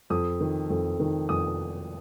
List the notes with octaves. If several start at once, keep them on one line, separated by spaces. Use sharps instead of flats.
F2 D#6
D#3
F2
D#3
F2 D#6